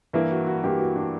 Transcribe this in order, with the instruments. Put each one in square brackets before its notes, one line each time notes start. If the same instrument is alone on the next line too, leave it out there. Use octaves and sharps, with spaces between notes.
[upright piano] G2 E3 A#3 [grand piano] E4
[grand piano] F#4
F#4
[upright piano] G2 E3 A#3 [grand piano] G4
[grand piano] F#4
D4